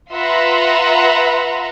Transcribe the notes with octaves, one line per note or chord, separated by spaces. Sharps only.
F4 B4 E5 F#5 A#5 C6